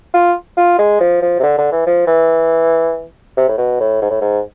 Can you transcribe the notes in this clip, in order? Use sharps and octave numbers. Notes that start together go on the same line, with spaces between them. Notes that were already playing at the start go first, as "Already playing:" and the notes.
F4
F4
G#3
F3
F3
C3
D3
D3
E3
F3
E3
C3
A2
B2
A2
G#2
A2
G#2